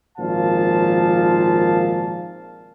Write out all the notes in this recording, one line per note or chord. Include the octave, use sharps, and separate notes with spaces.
G#1 A#2 F3 F5 A5